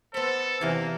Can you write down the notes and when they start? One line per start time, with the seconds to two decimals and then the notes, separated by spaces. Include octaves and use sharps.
0.14 B3 A4 C5 B5
0.61 E2 C3 E3 A#3